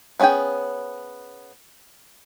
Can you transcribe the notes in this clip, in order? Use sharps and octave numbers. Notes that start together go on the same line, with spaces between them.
B3 C#4 F4 G#4 G5